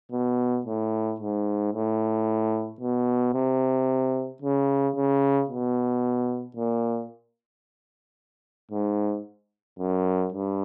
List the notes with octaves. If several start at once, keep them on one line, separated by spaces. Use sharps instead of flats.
B2
A2
G#2
A2
B2
C3
C#3
C#3
B2
A#2
G#2
F#2
G2